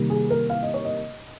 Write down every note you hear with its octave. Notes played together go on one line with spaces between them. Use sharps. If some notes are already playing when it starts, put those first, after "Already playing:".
Already playing: C3 D#3 G3 A#3
G#4
A#4
F5
D#5
C#5
D#5